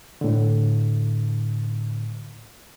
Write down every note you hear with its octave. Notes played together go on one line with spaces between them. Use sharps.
A2 D3